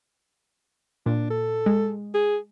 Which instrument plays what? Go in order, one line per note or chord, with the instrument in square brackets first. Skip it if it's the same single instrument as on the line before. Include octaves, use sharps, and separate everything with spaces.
[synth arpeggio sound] A#2 [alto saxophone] D4
[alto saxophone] A4
[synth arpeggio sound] G#3
[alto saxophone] G#4